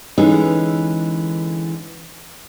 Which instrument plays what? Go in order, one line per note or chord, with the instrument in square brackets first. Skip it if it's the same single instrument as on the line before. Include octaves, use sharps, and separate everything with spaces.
[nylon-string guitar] D3 E3 G#3 C#4 D#4 A4